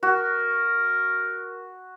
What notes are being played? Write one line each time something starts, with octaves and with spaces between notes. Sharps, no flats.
F#4 A#4